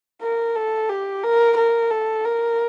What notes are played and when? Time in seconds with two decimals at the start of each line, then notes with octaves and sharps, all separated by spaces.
0.22 A#4
0.56 A4
0.89 G4
1.23 A#4
1.57 A#4
1.91 A4
2.25 A#4